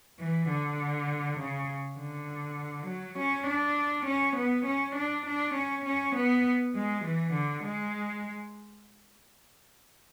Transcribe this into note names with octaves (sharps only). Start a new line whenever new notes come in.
E3
D3
C#3
D3
F#3
C#4
D4
C#4
B3
C#4
D4
D4
C#4
C#4
B3
G#3
E3
D3
G#3